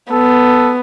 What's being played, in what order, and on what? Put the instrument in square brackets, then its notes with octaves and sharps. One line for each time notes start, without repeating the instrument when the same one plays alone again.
[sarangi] B3 [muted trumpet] A4